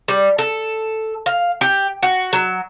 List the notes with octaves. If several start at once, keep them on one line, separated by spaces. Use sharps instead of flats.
G3
A4
F5
G4
F#4
F#3